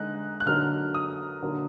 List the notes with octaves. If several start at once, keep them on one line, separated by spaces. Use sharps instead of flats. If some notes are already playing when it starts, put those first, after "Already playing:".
Already playing: D3 G#3 D#4 F#6
F#6
D3 F#3 A#3 D#4 F6
D#6
D3 F#3 A#3 D#4